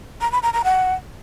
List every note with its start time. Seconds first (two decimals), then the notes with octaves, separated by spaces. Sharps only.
0.21 A#5
0.32 B5
0.43 A#5
0.53 A#5
0.64 F#5